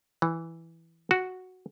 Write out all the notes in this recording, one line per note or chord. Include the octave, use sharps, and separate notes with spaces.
E3
F#4